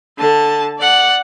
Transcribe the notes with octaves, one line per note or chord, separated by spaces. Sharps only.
D3 A5
D5 F#5